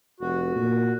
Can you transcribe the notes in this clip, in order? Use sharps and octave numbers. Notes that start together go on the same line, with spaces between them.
F1 F#4
A#2